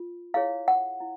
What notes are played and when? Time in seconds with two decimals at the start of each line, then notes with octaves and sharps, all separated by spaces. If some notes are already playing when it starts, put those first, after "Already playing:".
Already playing: F4
0.34 E4 G#4 C#5 F5
0.68 F#5
1.00 E4